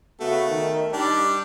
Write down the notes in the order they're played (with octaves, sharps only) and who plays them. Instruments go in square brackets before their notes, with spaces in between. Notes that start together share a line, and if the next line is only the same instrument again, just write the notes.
[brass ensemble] C#3 B3 F#4 [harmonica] A3
[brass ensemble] D#3
[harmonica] G3 D4 G4 [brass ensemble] D#4